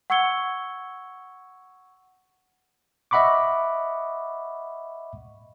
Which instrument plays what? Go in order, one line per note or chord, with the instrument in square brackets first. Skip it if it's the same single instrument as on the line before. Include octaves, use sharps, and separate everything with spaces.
[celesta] F#5 C#6 E6 G#6 C#7 G7
[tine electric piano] D#5 E5 F#5 B5 C#6 D6